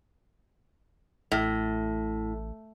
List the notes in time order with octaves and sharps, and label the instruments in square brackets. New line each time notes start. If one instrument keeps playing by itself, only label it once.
[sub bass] A1 [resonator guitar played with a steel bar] A2